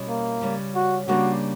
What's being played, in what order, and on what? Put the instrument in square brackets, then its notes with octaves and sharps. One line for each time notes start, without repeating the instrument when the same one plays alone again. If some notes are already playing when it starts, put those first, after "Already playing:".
Already playing: [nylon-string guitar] B2 G3 C#4 E4
[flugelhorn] A#3
[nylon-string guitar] C#3 G3 C#4
[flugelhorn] F#4
[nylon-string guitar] C#3 G3 A#3 D4 [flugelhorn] F#4